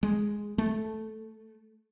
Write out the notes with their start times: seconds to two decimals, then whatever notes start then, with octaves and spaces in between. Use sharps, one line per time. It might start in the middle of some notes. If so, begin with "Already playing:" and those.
0.03 G#3
0.58 A3